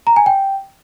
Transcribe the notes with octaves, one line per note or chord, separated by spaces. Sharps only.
A#5
G#5
G5